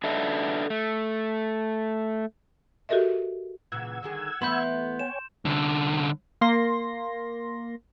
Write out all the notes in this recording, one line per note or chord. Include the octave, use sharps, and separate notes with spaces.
D4 A4 B4 D#5 E5
A3
F#4 G4 A4 A#4 D#5 E5
A#2 C#3 E3 F#5 E6 G#6
D3 D#3 G#4
E3 A3 B3 B5 C6 G6
C#5 G5 G#5 E7
C2 D3
A#3 C6 A#6